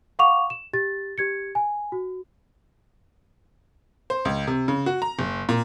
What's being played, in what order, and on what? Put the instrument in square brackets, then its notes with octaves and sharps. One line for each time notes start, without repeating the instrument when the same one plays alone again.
[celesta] F5 F#5 C#6 D6 F7
E7
G4 A6
G4 G#6 C#7
G#5
F#4
[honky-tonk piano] C5
C#2
C3
C#3
F#4
A#5
F#1
A#2